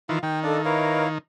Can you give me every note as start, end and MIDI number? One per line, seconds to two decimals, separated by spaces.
0.09 0.19 51
0.09 0.19 52
0.09 0.19 65
0.09 0.19 77
0.23 1.18 51
0.23 0.40 79
0.43 0.57 62
0.43 0.62 69
0.43 0.57 74
0.43 0.62 75
0.43 0.62 77
0.65 1.08 64
0.65 1.04 70
0.65 1.04 71
0.65 1.08 73
0.65 1.04 75
0.65 1.08 77